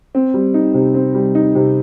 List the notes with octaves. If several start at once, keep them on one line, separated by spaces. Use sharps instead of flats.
C4
G3
D#4
C3
C4
G3
D#4
C3